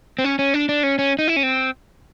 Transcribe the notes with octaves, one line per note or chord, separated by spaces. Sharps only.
C4
C#4
C#4
D4
D4
C#4
C#4
D#4
E4
C#4
C4